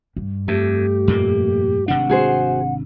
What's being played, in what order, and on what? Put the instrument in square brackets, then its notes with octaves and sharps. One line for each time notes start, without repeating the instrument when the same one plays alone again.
[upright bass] G2
[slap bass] F2 [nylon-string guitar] A3 [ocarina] G4
[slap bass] F2 A#2 A#3
[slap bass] G#1 C3 D4 [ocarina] F#5
[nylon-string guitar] F#4 G#4 C5